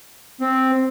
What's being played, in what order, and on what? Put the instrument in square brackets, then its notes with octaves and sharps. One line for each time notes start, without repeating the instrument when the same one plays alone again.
[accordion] C4